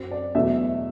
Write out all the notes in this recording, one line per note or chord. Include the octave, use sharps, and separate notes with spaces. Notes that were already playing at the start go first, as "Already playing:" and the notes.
Already playing: F#2 F#3 C4
D5
E2 B2 F#3 A3 E5